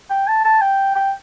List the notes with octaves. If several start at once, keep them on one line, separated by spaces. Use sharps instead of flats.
G5
A5
A5
G5
G5